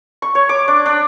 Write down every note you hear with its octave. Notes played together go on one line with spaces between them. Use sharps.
C#6
C#5
D6
D4
D4